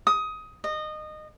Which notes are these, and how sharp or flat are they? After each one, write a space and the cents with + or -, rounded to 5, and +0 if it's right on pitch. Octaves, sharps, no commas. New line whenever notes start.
D#6 +15
D#5 -20